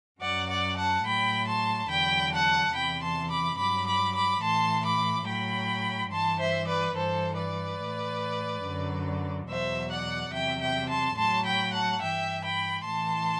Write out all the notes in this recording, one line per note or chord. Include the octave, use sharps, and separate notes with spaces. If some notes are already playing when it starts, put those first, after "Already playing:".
F#2 F#3 D5 F#5
D5 F#5
F#5 A5
A2 F#3 G5 B5
A5 C6
E2 D3 F#3 G5 B5
F#5 A5
E2 C3 E3 G5 B5
A5 C6
B5 D6
G2 F#3 B5 D6
B5 D6
B5 D6
A2 E3 A5 C6
B5 D6
A2 F#3 G5 B5
G2 E3 A5 C6
C5 E5
B4 D5
G2 E3 A4 C5
B4 D5
A2 E3
F#2 D3 F#3
E2 B2 F#3 C5 E5
D5 F#5
E2 C3 F#3 E5 G5
E5 G5
A5 C6
A2 F#3 A5 C6
G5 B5
F#5 A5
G2 E3 E5 G5
G5 B5
A2 E3 A5 C6